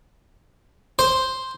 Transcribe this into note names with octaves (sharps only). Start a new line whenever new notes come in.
C5